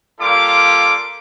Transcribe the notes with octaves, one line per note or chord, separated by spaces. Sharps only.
G3 A#3 F4 A4 D6